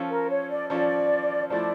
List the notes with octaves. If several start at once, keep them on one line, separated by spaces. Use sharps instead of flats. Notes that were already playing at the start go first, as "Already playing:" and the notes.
Already playing: F3 C#4 F4 A4
A#4
C#5
D5
F3 C#4 F4 A4 D5
F3 A3 E4 D5